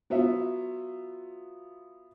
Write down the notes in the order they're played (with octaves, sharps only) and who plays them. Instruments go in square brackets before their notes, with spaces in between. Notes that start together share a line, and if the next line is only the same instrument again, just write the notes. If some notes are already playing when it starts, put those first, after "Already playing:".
[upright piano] F#3 B3 F4 E5